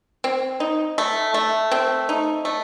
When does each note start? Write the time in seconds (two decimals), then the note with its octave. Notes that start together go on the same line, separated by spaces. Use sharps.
0.24 C4
0.60 D#4
0.98 A3
1.34 A3
1.71 C4
2.09 D#4
2.45 A3